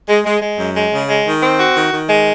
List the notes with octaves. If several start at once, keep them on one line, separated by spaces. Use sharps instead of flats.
G#3
G#3
G#3
F#2
G#3
C#3
G#3
D#3
C4
F#4
D#3
D#3
G#3